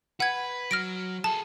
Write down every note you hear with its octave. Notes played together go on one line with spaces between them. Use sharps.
B4 F#5 G#6
F#3 F6 A#6 D7
G#4 A4 A5